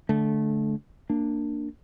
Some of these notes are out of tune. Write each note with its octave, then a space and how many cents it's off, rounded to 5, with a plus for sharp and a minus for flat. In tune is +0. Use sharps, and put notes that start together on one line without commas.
D3 +0 A3 -20
A#3 -15 D4 +5